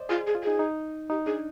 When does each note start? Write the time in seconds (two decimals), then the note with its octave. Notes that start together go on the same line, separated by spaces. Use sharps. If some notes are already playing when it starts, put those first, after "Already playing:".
Already playing: C5 D5 D#5
0.09 F4 G#4
0.27 G#4
0.35 F4
0.43 D#4 G#4
0.59 D#4
1.10 D#4 G4
1.26 D4 G#4